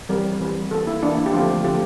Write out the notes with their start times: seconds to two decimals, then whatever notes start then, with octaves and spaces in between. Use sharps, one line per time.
0.09 E3 G3 C4 A#4
0.40 E3 G3 C4
0.71 E3 A#3 A4
0.87 E4
1.02 E3 A#3 D4
1.17 E4
1.26 G4
1.33 D3 F3 A3 C4 F4
1.64 D3 F3 A3 C4 G4